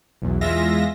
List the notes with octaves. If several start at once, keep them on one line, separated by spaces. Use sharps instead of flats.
B1 E2
E2 G#3 F4 E5 A#6